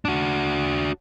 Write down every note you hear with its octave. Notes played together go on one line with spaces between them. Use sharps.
D4 F#4